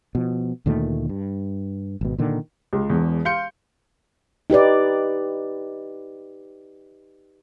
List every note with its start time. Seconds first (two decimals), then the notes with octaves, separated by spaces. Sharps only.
0.15 B2 F3
0.66 D2 A#2 D#3 A3
1.09 G2
2.01 G#1 B2
2.18 A#2 D3 D#3
2.73 C#2
2.90 E1 E2
3.25 F5 C6 G6 C#7
4.50 D#4 G4 B4 D5